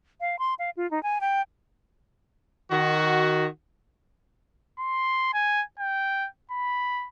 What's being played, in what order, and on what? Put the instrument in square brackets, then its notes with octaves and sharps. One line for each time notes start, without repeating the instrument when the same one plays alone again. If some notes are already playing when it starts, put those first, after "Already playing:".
[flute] F5
C6
F5
F4
D#4
G#5
G5
[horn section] D#3 F#4
[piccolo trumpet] C6
G#5
G5
B5